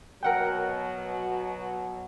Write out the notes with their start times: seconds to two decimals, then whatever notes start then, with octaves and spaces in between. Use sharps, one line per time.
0.23 B2 F#3 A#4 F#5 G5